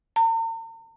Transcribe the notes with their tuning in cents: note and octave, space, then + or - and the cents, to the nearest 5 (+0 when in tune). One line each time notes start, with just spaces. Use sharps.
A#5 -45